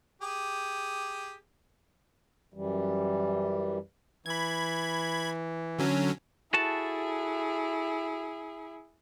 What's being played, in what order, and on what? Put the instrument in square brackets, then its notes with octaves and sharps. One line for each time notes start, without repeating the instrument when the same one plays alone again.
[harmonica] G4 G#4
[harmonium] F#2 E3 G3
[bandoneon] E3 [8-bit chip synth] B5 G#6
[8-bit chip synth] D3 F#3 C#4
[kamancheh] E4 G#4 [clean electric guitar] F#4 A4 A5